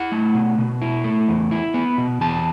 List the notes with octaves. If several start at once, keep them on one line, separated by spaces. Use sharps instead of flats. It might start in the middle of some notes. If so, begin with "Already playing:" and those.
Already playing: E4 F#5
A3
B2
B2
E4
A3
E2
E4
B3
B2
E2 A5